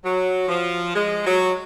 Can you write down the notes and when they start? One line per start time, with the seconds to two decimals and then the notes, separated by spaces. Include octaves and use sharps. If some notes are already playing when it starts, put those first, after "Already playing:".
0.03 F#3
0.48 F3
0.94 G#3
1.25 F#3